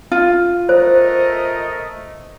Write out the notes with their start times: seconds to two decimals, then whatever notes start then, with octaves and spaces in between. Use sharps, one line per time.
0.12 F4
0.69 A3 A#4 C5 D#5